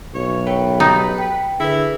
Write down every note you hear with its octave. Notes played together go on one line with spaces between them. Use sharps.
B1 C#5
A#4 B4 C#5 G5
D#4 G4
G5
D3 E4 G#4 B4